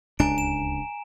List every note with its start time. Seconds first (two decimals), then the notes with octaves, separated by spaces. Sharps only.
0.19 D1 C#2 D4 G#5 A#5 D7
0.38 E7